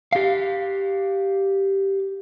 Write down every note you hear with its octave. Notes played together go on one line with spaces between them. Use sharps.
G4 F5